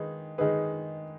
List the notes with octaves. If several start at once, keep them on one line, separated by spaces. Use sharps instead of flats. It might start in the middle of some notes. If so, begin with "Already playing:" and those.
Already playing: D#3 G#3 D#4 G#4 B4
D#3 G#3 D#4 G#4 B4